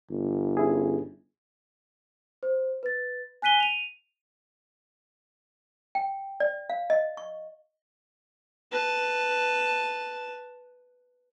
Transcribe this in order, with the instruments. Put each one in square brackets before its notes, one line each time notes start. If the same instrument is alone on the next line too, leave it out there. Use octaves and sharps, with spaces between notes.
[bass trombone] G1
[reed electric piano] C#4 E4 G#4
[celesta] C5
B4 A6
G#5 F#6 B6 D#7 G7
D#7 F7
[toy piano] G5
D5
F5
D#5
C#6
[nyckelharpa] B4 A5